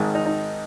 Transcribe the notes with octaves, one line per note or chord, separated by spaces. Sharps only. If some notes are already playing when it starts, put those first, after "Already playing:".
Already playing: G#1 G#2 D#3
D#4
D#4